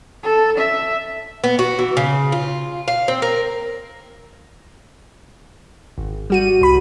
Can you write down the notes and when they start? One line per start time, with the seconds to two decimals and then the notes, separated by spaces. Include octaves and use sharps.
0.24 A4
0.58 E5
1.44 B3
1.59 F#4
1.79 E3
1.97 C#3
2.32 F4
2.88 F5
3.08 C4
3.22 A#4
5.98 G#1
6.30 G3 F#4 D#7
6.61 C2 B5